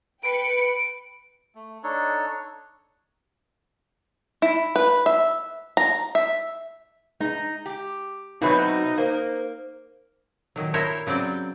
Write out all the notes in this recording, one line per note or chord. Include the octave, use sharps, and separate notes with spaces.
B4 G5 C#7 D7
A3
D4 D#4 A4 C#5
E4
B4
E5
A#5
E5
G#3 D#4
G4
B2 F#3 C4 D#4 E4 B4 C#5
A#3 C5
A#2 D#3 F#3
E4 A#4 C5 C#5
C#3 F#3 C4 D5 G5